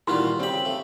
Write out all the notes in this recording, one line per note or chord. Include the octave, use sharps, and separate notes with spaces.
A#2 D#3 E3 G3 F4 F#4 C6
C#3 C4 G4 B5
A3